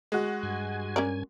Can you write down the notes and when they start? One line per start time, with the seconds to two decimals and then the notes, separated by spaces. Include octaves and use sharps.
0.12 G#3 F#4
0.43 G2 G#5
0.96 C#4 A#4 D5